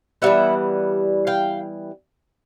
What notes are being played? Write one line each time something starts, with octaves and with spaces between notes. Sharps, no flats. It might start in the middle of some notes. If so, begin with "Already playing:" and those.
E3 G3 B3 E5 F#5
F5 G5